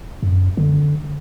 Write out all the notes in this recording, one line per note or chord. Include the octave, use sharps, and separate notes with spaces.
F#2
D3